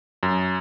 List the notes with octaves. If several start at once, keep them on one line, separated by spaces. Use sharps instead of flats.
F#2